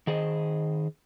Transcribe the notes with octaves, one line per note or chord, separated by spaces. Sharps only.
D#3 G#4 C5 D#5